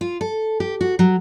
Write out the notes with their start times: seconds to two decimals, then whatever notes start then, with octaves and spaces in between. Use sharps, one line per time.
0.01 F4
0.21 A4
0.60 G4
0.81 F#4
0.99 F#3